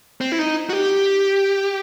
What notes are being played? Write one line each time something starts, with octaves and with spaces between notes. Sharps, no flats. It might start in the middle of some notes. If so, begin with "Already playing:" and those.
C4
E4
D#4
F#4
G4